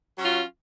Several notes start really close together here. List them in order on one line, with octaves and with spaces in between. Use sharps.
F#3 C#4 F4